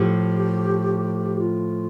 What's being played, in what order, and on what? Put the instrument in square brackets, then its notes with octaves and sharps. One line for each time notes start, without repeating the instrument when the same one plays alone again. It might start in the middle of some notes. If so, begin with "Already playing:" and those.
Already playing: [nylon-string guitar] A2 F3 A3 [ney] G4
[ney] F4